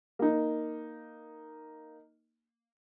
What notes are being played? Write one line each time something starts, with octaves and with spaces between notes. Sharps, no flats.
A#3 D#4